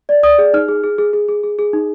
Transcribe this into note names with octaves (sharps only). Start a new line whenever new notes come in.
D5
D5 D#6
G#4
D#4 F6
G#4
G#4
G#4
G#4
G#4
G#4
G#4
D#4